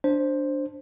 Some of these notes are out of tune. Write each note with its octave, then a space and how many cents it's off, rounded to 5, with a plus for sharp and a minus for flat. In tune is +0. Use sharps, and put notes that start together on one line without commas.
D4 +0 C5 +5